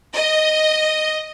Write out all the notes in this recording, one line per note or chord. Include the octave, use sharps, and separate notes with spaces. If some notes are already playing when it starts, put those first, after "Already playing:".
D#5